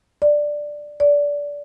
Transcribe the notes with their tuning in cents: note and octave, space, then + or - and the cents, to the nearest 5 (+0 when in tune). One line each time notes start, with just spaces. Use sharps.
D5 +5
D5 -20